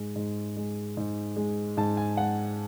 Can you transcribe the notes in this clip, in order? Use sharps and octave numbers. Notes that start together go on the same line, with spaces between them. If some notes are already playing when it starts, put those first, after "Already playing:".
Already playing: G#2 G#3
G#2
G#3
G#2
G#3
G#2 A5
G#5
G#3 F#5